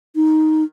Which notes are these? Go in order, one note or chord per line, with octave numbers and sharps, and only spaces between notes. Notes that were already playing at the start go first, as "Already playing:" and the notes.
D#4